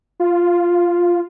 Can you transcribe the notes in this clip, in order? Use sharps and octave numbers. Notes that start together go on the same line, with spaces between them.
F4